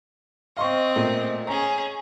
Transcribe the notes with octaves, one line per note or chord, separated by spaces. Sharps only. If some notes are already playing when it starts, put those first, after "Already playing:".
C4 D#5 F5 C6 C#6
A#2 A3
C#4 G#4 A#5